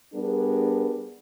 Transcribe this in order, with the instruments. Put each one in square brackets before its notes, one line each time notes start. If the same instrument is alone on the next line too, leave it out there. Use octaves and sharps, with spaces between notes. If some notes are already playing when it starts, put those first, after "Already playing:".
[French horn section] G3 B3 D4 G#4 A#4